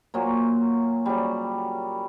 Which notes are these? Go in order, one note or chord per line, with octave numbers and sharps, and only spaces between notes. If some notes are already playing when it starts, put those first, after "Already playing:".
A#2 F#3 A#3
C#3 F#3 G3